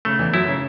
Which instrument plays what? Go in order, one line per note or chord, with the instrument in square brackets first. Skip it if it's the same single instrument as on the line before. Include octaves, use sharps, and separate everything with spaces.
[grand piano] C#3 [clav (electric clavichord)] A3
[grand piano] E2 E3
[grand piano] F#2 F#3 [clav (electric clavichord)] E4
[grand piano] C#3 C#4